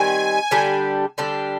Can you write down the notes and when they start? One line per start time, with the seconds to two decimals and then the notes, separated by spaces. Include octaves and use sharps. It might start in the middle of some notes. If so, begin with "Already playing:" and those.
Already playing: D#3 G3 C4 G#5
0.51 D3 G3 D4 G4
1.18 D3 G3 D4 G4